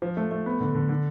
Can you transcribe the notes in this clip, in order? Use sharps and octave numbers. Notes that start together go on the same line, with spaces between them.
F3
A3
A3
B3
D3
D3
D3